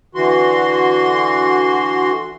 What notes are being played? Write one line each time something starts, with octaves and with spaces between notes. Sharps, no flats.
D3 E3 F#4 C6